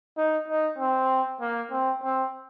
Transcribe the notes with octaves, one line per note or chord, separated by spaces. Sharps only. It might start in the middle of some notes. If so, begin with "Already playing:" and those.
D#4
D#4
C4
A#3
C4
C4